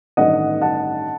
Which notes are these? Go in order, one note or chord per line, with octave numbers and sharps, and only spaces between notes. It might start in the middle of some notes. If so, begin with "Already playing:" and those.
A1 G2 D#3 A3 D#5 F#5
F#5 A5